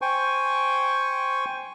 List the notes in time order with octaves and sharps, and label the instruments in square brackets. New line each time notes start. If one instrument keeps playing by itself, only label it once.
[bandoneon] C5 G5 G#5 C#6